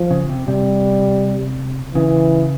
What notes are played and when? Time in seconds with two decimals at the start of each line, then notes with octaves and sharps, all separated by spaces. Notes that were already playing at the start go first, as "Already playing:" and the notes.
Already playing: F3
0.11 C#3
0.30 C3
0.47 C3 G3
1.94 C#3 E3